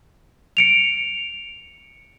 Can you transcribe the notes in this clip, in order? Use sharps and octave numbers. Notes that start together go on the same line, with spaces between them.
C#7 D7 F7